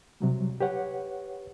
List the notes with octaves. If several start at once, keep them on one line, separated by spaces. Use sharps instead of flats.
C3 F#3 G3
G4 B4 C#5 F#5